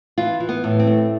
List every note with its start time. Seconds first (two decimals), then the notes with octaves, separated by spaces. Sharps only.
0.18 E3 F4
0.40 E3
0.49 B3
0.64 A2
0.79 C4
0.87 A3